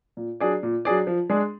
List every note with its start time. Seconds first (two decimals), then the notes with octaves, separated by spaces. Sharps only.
0.17 A#2
0.40 F#3 D4 G#4 D5
0.63 A#2
0.85 F#3 D4 G#4 D5
1.07 F3
1.29 G#3 D4 G#4